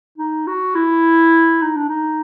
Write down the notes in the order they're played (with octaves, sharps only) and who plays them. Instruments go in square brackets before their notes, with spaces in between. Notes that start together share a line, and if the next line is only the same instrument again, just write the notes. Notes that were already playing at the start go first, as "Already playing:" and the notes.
[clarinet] D#4
F#4
E4
D#4
D4
D#4